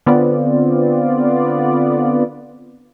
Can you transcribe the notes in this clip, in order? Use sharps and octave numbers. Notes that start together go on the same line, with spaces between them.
D3 B3 C4 F4 D5